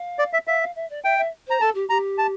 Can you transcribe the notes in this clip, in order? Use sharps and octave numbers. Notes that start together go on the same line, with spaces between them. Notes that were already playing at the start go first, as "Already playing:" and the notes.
Already playing: F5
D5
E5
E5 F5
F5
E5
D5
E5 G5
E5
C5 A#5
A4 A5
G4
G4 A#5
A5